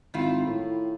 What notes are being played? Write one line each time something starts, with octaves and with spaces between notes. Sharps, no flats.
G#1 D#3 E4 F4
A2